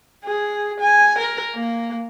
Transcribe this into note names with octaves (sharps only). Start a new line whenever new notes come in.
G#4
G#5
A#4
A#3